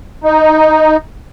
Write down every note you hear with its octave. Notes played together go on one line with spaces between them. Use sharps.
D#4